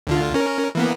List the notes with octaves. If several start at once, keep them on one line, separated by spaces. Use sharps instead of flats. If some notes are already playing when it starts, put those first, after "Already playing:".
D2 D3 F4
C#4 A#4
E3 A#3 B3